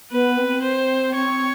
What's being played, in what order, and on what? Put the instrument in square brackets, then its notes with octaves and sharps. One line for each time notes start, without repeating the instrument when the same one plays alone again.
[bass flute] B3 [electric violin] B4
[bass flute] C4
[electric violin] C5
[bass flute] C4 [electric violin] C#5